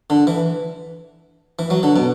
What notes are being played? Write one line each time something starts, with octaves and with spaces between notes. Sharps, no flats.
D3
E3
E3
F#3
D3
B2